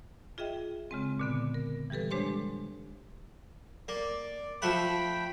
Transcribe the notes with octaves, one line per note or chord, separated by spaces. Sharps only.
F4 G#4 D#5 E5 G5
C#3 G#3 C4
A#2 D3 B3
A#4
E3 G3 G4 A4 B4
G#3 D4 G4 C5 C#5 C6
A#3 D5
F3 A3 F#5 G5 B5